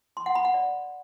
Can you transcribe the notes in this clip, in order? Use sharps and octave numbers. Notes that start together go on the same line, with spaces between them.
C6
F#5
B5
F#5
D5